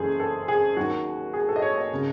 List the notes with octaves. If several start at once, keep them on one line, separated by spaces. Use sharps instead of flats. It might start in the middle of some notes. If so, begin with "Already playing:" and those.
Already playing: F#1 F#2 E3 G#4 A4 C5
A4
G#4
D#2 D#3 F#3 F#4
G#4
A4
D#5
C#5
D#5
C#3